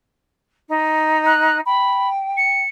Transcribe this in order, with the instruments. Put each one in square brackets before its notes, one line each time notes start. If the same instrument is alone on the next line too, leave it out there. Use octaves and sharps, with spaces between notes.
[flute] D#4
[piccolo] F#6
[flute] G5 [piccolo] B5
[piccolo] C#7